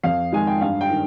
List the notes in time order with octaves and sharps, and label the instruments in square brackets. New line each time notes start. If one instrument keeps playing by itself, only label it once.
[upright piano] F2 F5
D#3 G#3 G#5
G5
G2 F5
G5
D#3